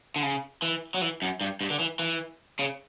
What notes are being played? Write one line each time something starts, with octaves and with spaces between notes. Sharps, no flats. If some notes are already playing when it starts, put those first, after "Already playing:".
D3
C#3
E3
F#3
E3
F#2
G2
G2
D3
E3
E3
C#3